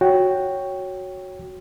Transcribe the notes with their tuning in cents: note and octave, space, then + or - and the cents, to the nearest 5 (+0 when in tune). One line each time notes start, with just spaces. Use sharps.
F#4 +0 C#5 +0 G5 +0